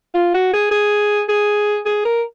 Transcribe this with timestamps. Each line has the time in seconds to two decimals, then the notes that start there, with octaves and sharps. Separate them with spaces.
0.14 F4
0.34 F#4
0.53 G#4
0.71 G#4
1.29 G#4
1.86 G#4
2.05 A#4